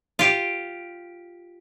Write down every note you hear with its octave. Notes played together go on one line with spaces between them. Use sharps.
F4 G4